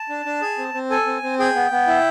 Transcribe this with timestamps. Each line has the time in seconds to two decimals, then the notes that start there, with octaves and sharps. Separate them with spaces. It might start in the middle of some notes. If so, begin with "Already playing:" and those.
Already playing: A5
0.09 D4
0.26 D4
0.42 G#4
0.58 C4
0.74 C4
0.90 A4 G#5
1.06 C4
1.23 C4
1.39 G#4 G5
1.55 B3
1.71 B3
1.87 E4